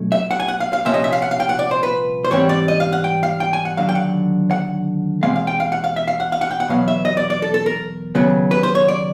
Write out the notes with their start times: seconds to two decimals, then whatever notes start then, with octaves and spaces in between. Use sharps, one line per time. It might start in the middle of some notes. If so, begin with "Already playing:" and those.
Already playing: B2 F#3 A3 C#4
0.12 E5
0.31 F#5
0.40 G#5
0.48 F#5
0.60 F5
0.73 F5
0.85 C2 A#2 F3 A#3 C#4 E5
0.94 D#5
1.04 E5
1.13 F5
1.22 F#5
1.31 F5
1.40 G5
1.49 F#5
1.59 D5
1.71 C5
1.83 B4
2.25 C5
2.31 G#2 E3 G3 C4 C#5
2.49 D5
2.68 D#5
2.80 F5
2.92 F#5
3.04 G5
3.23 F5
3.40 G5
3.53 G#5
3.65 F#5
3.77 D#2 D3 F#3 F5
3.89 G5
3.95 F#5
4.51 F#5
5.23 E2 B2 G#3 C4 F5
5.36 F5
5.47 G5
5.60 F5
5.72 F#5
5.84 F5
5.96 E5
6.08 F5
6.20 F#5
6.32 F5
6.41 F#5
6.51 G5
6.60 F#5
6.68 E2 B2 F#3 B3 F5
6.88 E5
7.05 D#5
7.17 D5
7.30 D5
7.42 A4
7.54 A4
7.66 A#4
8.15 D#2 C#3 F#3 B3
8.51 B4
8.63 C5
8.75 C#5
8.88 D5